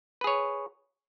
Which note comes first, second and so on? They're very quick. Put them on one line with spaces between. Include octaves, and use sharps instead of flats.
B4 G#4 C#5